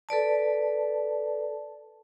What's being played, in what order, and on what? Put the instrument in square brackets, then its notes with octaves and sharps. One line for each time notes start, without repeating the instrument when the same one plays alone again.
[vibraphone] A4 B4 D5 A5